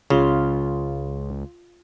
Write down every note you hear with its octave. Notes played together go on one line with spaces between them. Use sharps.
C#2 C#3 F4